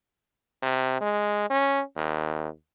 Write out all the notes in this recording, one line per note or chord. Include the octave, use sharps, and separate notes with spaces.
C3
G#3
C#4
D#2